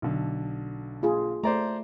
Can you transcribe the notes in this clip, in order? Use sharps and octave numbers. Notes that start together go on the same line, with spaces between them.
B1 D3
A#3 F4 G#4
A3 C5 D5 A#5